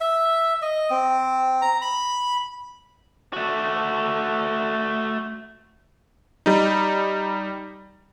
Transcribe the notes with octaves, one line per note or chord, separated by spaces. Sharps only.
E5
D#5
C4
A#5
B5
A3 F#4
G3 D#4